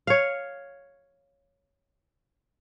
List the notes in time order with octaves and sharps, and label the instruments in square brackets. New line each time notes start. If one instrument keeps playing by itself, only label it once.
[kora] C#5 F5